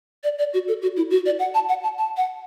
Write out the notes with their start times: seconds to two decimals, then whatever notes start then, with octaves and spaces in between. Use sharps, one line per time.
0.24 D5
0.39 D5
0.53 F#4
0.68 A4
0.82 F#4
0.97 E4
1.10 F#4
1.26 D5
1.39 F#5
1.54 A5
1.69 F#5
1.83 A5
1.98 A5
2.17 F#5